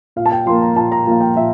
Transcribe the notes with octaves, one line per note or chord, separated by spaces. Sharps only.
A#2 F5
A5
G5
F3 A#3 C6
A#5
A#2 A5
A#5
F3 A#3 F5
G5
A#2 E5